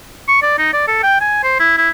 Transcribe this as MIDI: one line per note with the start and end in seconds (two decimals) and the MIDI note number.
0.28 0.41 85
0.43 0.56 74
0.58 0.71 63
0.73 0.85 74
0.88 1.02 69
1.03 1.17 79
1.21 1.43 80
1.44 1.59 72
1.60 1.76 64
1.78 1.90 64